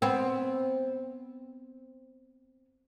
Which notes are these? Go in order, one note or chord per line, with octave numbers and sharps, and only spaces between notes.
B3 C4